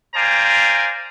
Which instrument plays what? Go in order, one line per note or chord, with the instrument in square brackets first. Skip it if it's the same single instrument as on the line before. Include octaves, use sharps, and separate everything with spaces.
[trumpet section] C5 D5 F5 G5 G#5 A#5